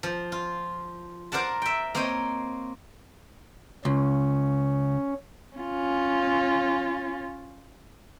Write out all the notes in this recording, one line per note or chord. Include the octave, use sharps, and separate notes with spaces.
F3
F4
A#4 C5 D5 F#5 A5
E5 G5
A#3 C4 C5 C#5 D#5
C#2 C#4
C#4 F4